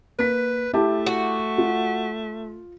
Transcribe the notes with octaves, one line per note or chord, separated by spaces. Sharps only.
A#3 B4 B6
A3 E4 G4 A5
F#4
F4